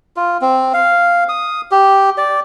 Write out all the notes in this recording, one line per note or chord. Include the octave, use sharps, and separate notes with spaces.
F4
C4
F5
D#6
G4
D5